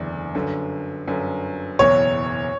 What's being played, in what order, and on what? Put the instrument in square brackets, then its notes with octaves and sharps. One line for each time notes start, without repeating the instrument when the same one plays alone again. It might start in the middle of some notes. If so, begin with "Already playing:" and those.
Already playing: [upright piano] F#1 E2 D3 A3 D4
G1 F#2 D3
G1 F#2 D3
[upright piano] F#1 E2 B2 F#3 [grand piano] C#5